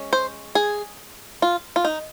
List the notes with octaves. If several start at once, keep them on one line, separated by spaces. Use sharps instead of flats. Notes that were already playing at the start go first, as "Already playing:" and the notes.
Already playing: G#3 C#4
C5
G#4
F4
F4
D#4